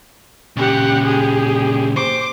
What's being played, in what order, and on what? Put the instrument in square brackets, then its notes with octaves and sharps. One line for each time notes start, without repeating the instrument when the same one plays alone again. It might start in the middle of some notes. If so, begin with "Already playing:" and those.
[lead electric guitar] A#2 C#3 [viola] G4 F#5
[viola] G4 G#4
[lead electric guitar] C5 [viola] D6